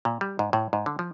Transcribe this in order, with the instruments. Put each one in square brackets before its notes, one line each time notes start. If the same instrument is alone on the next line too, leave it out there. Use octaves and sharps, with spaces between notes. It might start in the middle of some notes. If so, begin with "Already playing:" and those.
[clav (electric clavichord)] A#2
G3
G#2
A2
G#2
D3
F3